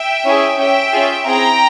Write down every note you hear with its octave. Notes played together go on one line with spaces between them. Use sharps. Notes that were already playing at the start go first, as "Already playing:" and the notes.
Already playing: E5 G5
C#4 E4 G#4
C#4 G4 E5 G5
C#4 F4 G#4
C4 E4 G#4 G5 A#5